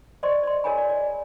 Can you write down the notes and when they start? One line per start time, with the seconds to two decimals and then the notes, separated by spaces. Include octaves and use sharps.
0.23 C5 D5 D#5 C6 C#6
0.43 D5 C6
0.64 G#4 A#4 C#5 D#5 G#5 B5
0.78 D5
0.89 D5